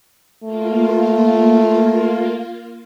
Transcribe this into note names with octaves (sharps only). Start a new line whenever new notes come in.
A3 A#3 F4